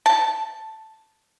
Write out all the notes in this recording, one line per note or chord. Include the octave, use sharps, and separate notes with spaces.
A5